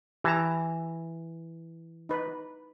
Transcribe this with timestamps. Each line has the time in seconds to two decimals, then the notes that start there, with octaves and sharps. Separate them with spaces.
0.24 E3 G4 A5 A#5
2.09 D#4 B4